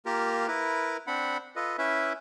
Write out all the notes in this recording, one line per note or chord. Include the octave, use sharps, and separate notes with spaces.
A#3 F4 G4 A#4
E4 A#4 B4
C4 D4 F#5 B5
F4 A4 B4 D#5
C#4 E4 B4 E5